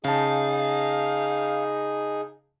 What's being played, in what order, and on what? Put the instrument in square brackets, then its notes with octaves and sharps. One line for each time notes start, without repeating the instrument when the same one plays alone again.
[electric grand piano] C#3 A5 [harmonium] D#4 G#4 [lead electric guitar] F5